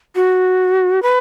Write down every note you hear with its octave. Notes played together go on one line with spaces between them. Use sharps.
F#4
B4